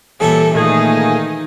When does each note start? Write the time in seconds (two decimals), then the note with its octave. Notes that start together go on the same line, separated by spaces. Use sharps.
0.20 A#2 E3 G3 A4 C#5 E5
0.55 A#2 D#3 A3 D#4 G#4